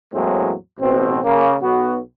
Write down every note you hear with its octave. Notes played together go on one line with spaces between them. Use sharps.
E2 A2 F#3 G#3 A#3 C4
A1 B2 C4
C#3 A#3
B1 B3 F#4